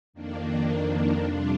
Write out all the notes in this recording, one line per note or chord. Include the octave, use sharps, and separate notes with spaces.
F2 D#3 A#3 D4
F2 C3 G3 D4 F4